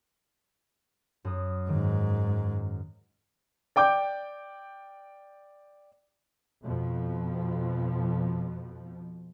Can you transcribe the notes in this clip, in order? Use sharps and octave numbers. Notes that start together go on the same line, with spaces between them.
F#2 D#6
G#2 D#3
D5 G5 D6 G6
F2 B2 F3